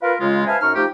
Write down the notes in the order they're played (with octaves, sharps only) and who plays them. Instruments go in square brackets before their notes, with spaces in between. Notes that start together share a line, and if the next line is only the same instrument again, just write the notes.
[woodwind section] F4 A#4 B4
C#3 G#3 F4
B4 C5 E5 F5 G#5 A5
F#2 D#4 C#6 F6
F3 A3 D#4 G4